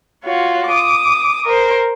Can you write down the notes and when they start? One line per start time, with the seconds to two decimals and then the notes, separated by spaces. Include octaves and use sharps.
0.24 F4 F#4 C#5
0.68 D6 D#6
1.45 A#4 C5